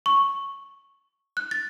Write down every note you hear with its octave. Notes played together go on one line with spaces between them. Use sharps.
C#6
F#6
A6